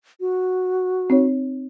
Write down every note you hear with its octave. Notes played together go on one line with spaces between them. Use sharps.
F#4
C4 D#4 C#5